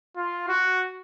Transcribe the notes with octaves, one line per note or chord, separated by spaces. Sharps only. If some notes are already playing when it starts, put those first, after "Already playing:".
F4
F#4